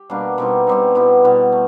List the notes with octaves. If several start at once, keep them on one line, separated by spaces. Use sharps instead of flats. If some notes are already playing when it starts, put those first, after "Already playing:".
Already playing: G4
B2 G3 A#3 D4
B2 G3 C4 D#4
B2 G3 C4 D#4
B2 G3 B3 E4
B2 G3 B3 E4
A3